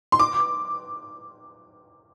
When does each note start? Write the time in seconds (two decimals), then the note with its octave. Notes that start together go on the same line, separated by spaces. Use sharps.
0.12 C6
0.19 D6